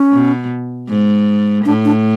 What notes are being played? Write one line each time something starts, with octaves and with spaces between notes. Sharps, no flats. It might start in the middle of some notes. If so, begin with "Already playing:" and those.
Already playing: C#4
B2
G#2
A2 D4
D4